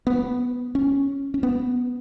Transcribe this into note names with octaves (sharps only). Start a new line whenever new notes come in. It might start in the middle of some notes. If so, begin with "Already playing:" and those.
B3
C#4
C#4
B3